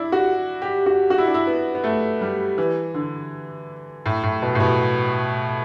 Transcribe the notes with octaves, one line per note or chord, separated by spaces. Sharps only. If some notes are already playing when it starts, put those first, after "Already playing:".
Already playing: D4 E4
F#4
G4
F#4
F#4
E4
D4
E4
B3
B3
A3
G3
E3
D3
A2
A2
B2
A2
B2